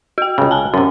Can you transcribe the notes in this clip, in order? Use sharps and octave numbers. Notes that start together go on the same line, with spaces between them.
F#4 G5
C#2 C#3
G#5 A5
F#2 C3 C#4